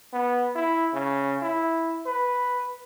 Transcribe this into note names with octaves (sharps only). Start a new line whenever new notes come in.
B3
E4
C#3
E4
B4